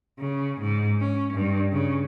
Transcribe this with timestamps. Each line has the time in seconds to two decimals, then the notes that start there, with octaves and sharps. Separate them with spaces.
0.18 C#3
0.60 G#2
1.00 C#4
1.33 G2
1.72 C#3